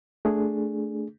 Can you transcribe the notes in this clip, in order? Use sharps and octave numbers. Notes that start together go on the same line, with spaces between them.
A3 D4 G#4